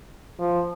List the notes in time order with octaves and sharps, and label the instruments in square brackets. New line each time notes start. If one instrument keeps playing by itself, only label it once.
[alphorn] F3